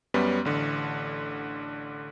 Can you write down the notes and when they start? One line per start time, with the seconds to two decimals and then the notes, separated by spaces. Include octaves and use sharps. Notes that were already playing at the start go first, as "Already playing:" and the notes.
0.14 F#2 G3 B3 C#4
0.45 A1 D3